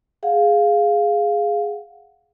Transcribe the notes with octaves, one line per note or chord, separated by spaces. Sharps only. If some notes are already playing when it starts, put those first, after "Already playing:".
G#4 F5 F#5